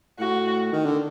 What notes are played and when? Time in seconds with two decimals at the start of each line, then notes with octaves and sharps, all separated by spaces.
0.19 A2 F#4
0.72 D#3
0.85 D3